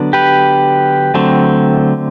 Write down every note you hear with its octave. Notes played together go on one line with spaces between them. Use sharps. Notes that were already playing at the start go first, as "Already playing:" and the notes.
Already playing: D3 F#3 B3 D4
G4 B4
D3 F#3 A3 C4